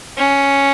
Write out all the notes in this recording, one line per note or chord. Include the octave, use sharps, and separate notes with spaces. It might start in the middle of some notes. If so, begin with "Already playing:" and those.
C#4